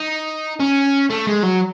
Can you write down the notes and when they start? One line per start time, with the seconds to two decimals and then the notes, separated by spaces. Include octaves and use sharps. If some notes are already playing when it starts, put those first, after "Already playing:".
Already playing: D#4
0.60 C#4
1.10 A3
1.27 G#3
1.43 F#3